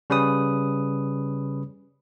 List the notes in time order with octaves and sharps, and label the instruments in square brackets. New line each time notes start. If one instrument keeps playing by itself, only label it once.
[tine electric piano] C#3 G3 C#4 B4 D#6